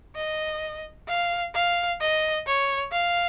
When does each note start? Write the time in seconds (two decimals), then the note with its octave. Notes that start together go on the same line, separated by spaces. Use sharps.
0.16 D#5
1.08 F5
1.54 F5
2.00 D#5
2.46 C#5
2.92 F5